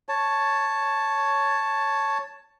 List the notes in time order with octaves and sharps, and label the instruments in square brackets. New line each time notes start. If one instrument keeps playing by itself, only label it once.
[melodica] C#5 A5